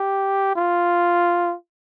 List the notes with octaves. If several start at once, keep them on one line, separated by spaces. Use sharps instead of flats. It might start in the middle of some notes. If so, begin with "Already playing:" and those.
Already playing: G4
F4